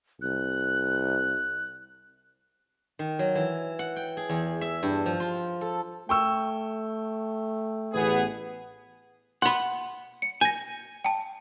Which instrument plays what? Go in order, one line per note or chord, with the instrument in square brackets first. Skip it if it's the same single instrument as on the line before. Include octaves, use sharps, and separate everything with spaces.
[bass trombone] C2 [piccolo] F#6
[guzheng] D#3
F#3
E3
F#5
G5
G#4
E2
E5
G2
F3
F4
A4
[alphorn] A3 [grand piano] G5 C#6 E6
[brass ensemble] A1 B3 G#4
[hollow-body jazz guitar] F#5 B5 [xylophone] C6
[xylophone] C#7
[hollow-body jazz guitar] G#5 [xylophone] G6 A#6
[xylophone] G5 A5